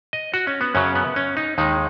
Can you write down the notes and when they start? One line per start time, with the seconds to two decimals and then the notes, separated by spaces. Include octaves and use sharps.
0.13 D#5
0.34 F#4
0.47 C#4
0.61 B3
0.75 F#2 C#3 F#3 C#4
0.95 B3
1.16 C#4
1.37 D#4
1.58 D#2 D#3 G#3 D#4